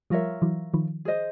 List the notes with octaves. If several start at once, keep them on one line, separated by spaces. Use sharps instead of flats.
F3 G3 F4 A#4 C#5 E5
E3 F#3
D#3 F3
G#4 C5 D#5